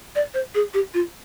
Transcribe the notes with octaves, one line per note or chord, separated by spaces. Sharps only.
D5
C5
G#4
G4
F4